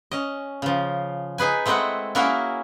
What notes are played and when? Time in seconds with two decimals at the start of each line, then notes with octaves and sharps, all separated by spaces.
0.11 C#4 D#5
0.62 C#3 F3
1.38 D#4 G#4 B4 G#5
1.66 G#3 A3 C4 E4 D#5 F#5
2.15 A#3 C#4 E4 F#4 G#4 A#4